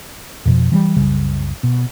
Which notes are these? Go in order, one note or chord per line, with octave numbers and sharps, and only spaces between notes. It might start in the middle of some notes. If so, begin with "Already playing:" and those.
F2 B2 F3
E3 F#3 G3
F#1 C2 C#3 G3
B2